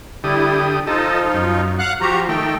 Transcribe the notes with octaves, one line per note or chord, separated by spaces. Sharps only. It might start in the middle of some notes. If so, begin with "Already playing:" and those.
D3 G3 E4 G4 D#6
F3 D#4 F4 A4 D#5
F#2
F5 F#5 F#6
F3 F#4 G4 A#5
D#3 A3 G5